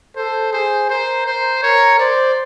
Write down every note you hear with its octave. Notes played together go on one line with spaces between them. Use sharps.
A4 C5
G#4 C5
A#4 C5
C5
A#4 C#5
C5 D5